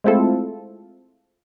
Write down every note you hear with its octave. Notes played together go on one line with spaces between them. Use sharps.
G#3 A3 C4 E4 F4 A4